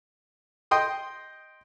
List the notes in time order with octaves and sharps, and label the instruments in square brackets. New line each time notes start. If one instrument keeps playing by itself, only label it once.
[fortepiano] D#5 G5 C6 D#6